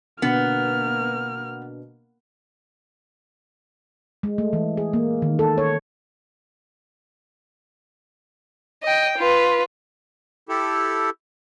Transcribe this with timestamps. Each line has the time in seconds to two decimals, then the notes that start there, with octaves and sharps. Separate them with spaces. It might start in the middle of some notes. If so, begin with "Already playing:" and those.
0.22 B2 D3 A#3 B3 F6 C#7
4.23 G#3
4.38 A3
4.53 E3
4.77 G#4
4.94 A#3
5.22 D#3
5.39 A4
5.58 C#5
8.83 D#5 G5
9.18 F4 B4
10.49 E4 G4 A4